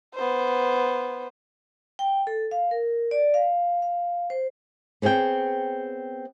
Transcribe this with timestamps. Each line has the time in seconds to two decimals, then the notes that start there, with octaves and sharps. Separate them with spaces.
0.15 B3 C5
1.99 G5
2.27 A4
2.51 F5
2.71 A#4
3.11 D5
3.34 F5
3.82 F5
4.30 C5
5.02 B3 C4 G#4 C#5 G5